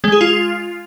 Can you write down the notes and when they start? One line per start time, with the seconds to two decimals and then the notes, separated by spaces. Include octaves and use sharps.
0.04 G#3
0.12 G#4
0.21 F4